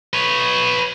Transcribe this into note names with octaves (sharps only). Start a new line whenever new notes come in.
B4 C#5